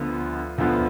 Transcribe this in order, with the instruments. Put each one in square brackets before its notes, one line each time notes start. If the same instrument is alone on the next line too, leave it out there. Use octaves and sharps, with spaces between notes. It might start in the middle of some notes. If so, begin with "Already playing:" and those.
Already playing: [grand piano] D2 D3 F3 B3 F4
D2 D3 F3 B3 F4